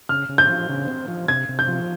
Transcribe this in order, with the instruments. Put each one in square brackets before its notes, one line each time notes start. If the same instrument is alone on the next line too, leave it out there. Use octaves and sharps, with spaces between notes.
[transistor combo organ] C#3 [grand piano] F6
[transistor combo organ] C#3
[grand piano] G6
[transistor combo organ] F3
C#3
C4
F3
[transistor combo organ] C3 [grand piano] G#6
[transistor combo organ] C3
[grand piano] G6
[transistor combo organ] F3